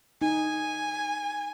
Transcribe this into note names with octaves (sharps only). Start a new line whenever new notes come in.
D#4 G#5